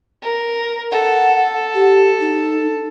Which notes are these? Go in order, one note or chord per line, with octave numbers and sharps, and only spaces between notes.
A#4
A4 F#5
G4
D#4